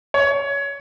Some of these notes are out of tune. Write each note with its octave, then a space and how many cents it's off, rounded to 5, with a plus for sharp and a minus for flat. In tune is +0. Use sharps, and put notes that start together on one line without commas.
C#5 +20